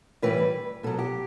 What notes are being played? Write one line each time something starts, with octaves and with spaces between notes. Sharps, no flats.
A2 E3 G3 B4
B2 F#3 A4
G4